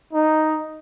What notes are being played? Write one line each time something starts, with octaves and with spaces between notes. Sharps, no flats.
D#4